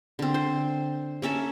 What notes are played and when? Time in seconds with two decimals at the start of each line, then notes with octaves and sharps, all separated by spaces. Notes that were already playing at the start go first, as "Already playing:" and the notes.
0.19 D3 C4
0.34 C5
1.22 A#3 C#4 A4 E5